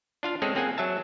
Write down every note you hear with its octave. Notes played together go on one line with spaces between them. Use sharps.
D4 F4 F5
G#3 C4 C#4 G#4 A4
A#3 C4 G#4 F#5 G#5
F#3 E5 A5